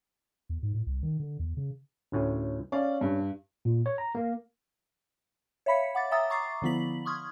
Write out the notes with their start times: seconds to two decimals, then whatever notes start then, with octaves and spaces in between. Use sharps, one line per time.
0.49 E2
0.63 G#2
0.74 A2
0.87 C2
1.03 D#3
1.20 D3
1.39 E2
1.57 C#3
2.12 D2 A2 C#4
2.72 C#4 D5 F5
3.01 G2
3.65 A#2
3.86 C#5
3.98 A#5
4.15 A#3
5.66 C#5 E5 F5 B5 B6 C#7
5.95 F#5 D6 A6
6.11 E5 G5 A#5 D#6 E6 A6
6.30 A#5 C#6 D6 A6 C7
6.62 D3 F3 B3 E4 B6 F#7
7.05 C6 C#6 D#6 F6 G#6